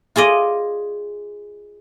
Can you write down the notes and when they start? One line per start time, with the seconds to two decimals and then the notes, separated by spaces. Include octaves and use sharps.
0.16 F4 G#4 D5 D#5